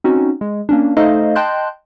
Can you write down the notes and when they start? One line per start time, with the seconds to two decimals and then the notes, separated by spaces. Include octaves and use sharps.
0.04 C4 C#4 D#4 F#4
0.41 G#3
0.69 A#3 C#4 D4
0.97 A3 D#4 A4 C5 D#5 F5
1.36 D#5 G5 A5 C6 F#6 G6